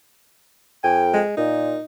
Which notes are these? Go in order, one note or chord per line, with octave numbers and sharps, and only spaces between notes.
F2 G5 G#5
G#3
A#2 D#4